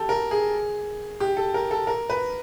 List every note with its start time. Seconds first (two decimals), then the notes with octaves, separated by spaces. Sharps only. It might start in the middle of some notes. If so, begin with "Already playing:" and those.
Already playing: G4 A4
0.09 A#4
0.31 G#4
1.20 G4
1.37 A4
1.54 A#4
1.71 A4
1.87 A#4
2.10 B4